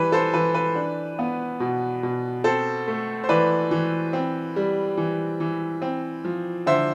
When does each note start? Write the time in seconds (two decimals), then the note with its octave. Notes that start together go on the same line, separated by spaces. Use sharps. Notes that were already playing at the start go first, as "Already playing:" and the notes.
Already playing: E3 G3 B4
0.12 A4 C5
0.34 E3 B4
0.54 B4
0.75 D4
1.19 B3
1.60 B2
2.03 B2
2.44 C4 A4 C5
2.87 A3
3.24 C5
3.29 E3 B4 D5
3.71 E3
4.13 C4
4.56 G3
4.97 E3
5.40 E3
5.82 C4
6.25 F3
6.66 D3 C5 E5